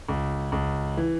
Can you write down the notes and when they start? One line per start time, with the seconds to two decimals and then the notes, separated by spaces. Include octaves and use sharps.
0.09 C#2
0.52 C#2
0.97 E3